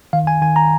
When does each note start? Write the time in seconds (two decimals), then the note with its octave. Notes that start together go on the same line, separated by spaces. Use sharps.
0.13 D#3 F5
0.27 G#5
0.41 D#3 G#5
0.56 A#5